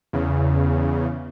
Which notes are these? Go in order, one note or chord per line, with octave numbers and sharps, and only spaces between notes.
E2 C#3